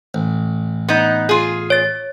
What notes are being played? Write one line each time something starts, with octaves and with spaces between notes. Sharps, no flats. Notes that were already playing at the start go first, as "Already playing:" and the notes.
A1
B3 D#4
F4 G#4
C#5 A6